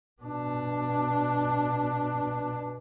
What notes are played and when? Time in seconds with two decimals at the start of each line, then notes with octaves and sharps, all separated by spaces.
0.22 B2 D4